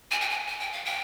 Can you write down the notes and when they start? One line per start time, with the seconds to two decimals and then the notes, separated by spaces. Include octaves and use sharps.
0.11 G#5
0.21 G5
0.30 G#5
0.48 G#5
0.60 G5
0.72 F5
0.85 G5